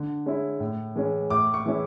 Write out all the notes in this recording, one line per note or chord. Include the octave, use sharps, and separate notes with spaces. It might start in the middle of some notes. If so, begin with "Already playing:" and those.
Already playing: D3
G#3 C#4 E4
A2
E3 G#3 C#4
A2 D6
C#6
E3 G#3 C#4 E4